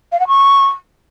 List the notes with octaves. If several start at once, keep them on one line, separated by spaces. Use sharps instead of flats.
F5
F#5
C#6